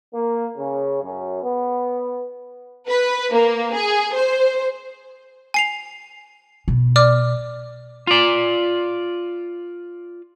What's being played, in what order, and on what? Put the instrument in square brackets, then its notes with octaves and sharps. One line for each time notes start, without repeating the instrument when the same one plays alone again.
[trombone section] A#3
C#3
F#2
B3
[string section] B4
A#3
G#4
C5
[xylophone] G#5 C7 F7
[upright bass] B2
[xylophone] D5 D6 F6
[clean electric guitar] F4 D5